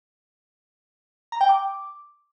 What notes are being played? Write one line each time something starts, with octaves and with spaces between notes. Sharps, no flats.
A#5
G5
D6